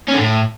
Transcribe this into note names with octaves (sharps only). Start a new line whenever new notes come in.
C#4
D3
A2